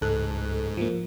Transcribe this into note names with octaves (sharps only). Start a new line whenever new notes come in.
C#2 G#2 A4 F#6
F3 A#3